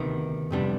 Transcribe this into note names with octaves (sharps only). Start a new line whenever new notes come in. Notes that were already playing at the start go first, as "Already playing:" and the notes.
Already playing: D2 C3 D#3 B3
F2 C3 G3 B3 D4